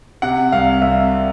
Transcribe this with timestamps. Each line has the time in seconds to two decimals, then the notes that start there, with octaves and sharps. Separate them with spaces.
0.22 C3 F#5
0.52 C2 F5
0.82 C2 E5